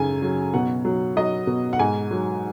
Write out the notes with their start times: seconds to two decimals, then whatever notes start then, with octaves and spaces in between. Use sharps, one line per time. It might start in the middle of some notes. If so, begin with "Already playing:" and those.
Already playing: F#2 C#3 G#5
0.22 F#3
0.54 B2 F#5
0.85 F#3
1.17 F#3 D#5
1.47 B2
1.73 F#5
1.79 G#2 G#5
2.11 F#3